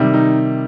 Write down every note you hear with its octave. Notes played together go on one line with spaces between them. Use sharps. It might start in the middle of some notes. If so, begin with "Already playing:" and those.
Already playing: C3 D#3 G3
D#4